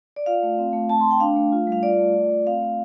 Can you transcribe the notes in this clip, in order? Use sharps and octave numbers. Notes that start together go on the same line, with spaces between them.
D5
F4 F5
A3
C4
A3
C4 A5
C6
A3
G5
D4 F5
A3
F4
G3 F5
F4 D5
A3
F4
A3
C4 F5
A3